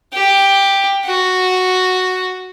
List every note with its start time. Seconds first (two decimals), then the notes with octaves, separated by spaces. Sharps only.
0.13 G4
1.05 F#4